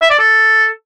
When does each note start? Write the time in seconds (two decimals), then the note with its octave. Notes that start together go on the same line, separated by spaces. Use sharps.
0.02 E5
0.10 D5
0.19 A4